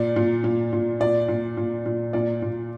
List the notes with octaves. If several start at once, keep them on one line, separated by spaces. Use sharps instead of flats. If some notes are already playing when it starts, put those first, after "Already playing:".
Already playing: A#2 D5
A#2
A#2
A#2
A#2 D5
A#2
A#2
A#2
A#2 D5
A#2